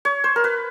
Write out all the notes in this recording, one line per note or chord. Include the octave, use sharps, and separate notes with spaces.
C#5
C5
A#4
B4